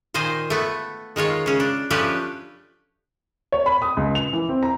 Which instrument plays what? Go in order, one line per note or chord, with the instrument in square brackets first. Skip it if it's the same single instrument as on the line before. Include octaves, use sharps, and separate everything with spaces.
[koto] A#2 D#3 C5 D#5 G#5
A3 B3
D#3 G#3 F4 C#5
C#3 C#4
D4
F3 A3 C#4 D4 G4 B4
[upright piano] C#5
B5
D#6
C#2
F7
E3
C4
A#5